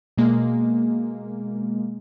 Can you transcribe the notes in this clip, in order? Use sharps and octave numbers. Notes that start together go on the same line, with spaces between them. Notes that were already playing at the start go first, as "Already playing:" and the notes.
B2 G#3 A#3